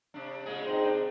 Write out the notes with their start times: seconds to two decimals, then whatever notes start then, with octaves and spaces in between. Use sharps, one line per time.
0.14 C3 D4
0.46 A#2 C#3 G#3 G#4
0.65 C4 D#4 C5
0.84 D4